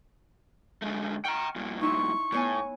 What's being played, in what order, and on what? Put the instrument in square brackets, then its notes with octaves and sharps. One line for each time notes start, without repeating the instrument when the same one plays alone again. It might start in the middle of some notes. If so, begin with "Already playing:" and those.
[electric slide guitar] D3 G#3 A3
[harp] F#5 C#6 F6 [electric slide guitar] G5 A#5
[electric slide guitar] G2 A#2
[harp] D#4 E4 C6 [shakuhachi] C#6
[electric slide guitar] A2 [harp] B3 C#5 G#5